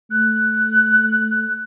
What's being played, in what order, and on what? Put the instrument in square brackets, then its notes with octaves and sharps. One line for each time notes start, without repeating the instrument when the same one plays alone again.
[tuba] A3 [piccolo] F#6